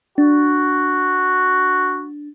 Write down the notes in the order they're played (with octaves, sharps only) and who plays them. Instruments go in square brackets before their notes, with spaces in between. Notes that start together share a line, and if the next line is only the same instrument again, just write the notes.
[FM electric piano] D4 [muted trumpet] F#4